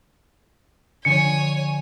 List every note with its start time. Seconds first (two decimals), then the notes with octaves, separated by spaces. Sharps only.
1.05 D3 F3 C#5 G#5 C#7 D7